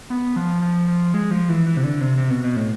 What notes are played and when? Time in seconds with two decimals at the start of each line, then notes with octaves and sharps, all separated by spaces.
0.10 B3
0.36 F3
0.62 F3
0.88 F3
1.14 G#3
1.31 F3
1.49 E3
1.66 E3
1.77 C3
1.84 D3
2.01 C3
2.17 C3
2.30 B2
2.43 B2
2.56 A2